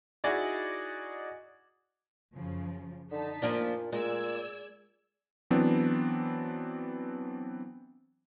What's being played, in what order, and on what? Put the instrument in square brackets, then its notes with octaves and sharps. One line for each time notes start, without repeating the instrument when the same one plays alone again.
[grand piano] D#4 E4 F#4 G#4 D5 D#5
[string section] F#2 C#3 F3
[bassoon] D3 [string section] D#4 A5 B6
[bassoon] A#2 [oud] F3 A#3 D4
[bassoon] A#2 [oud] G#3 [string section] D5 E6 G#6
[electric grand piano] E3 F#3 B3 C4 D4